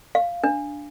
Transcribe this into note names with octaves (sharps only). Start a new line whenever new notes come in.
F5
D4